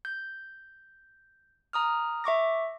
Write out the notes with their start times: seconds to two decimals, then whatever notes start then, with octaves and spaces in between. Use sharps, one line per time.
0.05 G6
1.73 A#5 D#6 F6
2.24 E5 C#6 D6 A#6